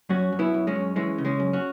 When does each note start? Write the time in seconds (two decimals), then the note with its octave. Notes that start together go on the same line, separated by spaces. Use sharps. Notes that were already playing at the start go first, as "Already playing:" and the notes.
0.09 F#2 C#4 F#4
0.32 F#2
0.39 B3 E4
0.54 F#2
0.67 G#3 C#4
0.76 F#2
0.96 E3 G#3 C#4
1.18 C#3
1.25 G#3 C#4
1.40 F#2
1.53 C#4 F#4